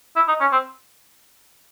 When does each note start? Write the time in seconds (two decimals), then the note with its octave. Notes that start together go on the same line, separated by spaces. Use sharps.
0.16 E4
0.28 D#4
0.41 C#4
0.52 C4